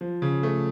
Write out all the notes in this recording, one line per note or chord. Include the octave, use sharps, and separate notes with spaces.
F3
C#3
A3